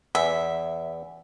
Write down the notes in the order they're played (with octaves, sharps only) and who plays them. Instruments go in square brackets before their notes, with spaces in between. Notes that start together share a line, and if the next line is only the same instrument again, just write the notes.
[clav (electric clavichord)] E2 [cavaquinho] E5